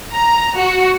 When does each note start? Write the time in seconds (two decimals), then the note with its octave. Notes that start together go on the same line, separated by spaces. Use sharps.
0.13 A#5
0.58 F#4